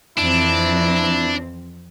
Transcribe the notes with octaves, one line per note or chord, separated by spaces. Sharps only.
F2 E3 C4 D4 E4